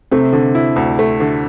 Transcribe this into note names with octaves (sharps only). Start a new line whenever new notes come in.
C3 A3 C4
D3
E4
D2
A3
D3